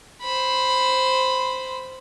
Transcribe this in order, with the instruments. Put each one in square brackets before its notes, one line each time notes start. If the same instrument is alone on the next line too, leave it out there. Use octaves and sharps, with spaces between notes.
[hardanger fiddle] C5 B5